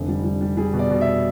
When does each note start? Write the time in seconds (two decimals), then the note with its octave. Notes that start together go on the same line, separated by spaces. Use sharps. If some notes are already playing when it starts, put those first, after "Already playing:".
Already playing: F1 D3
0.08 G3
0.24 G3
0.41 G3
0.57 G3 G#4
0.73 B2
0.79 D5
0.90 B2
1.01 E5